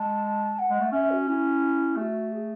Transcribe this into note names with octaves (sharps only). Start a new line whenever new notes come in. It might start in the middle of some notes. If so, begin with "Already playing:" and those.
Already playing: G#3 A5
F#5
G#3
A3
C#4 E5
F#4
C#4 E4
A3 F#4 G#4
G#4